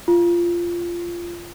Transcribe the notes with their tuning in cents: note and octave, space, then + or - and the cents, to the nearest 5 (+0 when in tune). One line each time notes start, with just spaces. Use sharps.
F4 -15